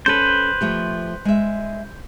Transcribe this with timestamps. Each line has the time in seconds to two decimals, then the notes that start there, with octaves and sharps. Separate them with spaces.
0.06 C#4 A4 B4 C5
0.61 F3 A3 G4
1.25 G#3 E5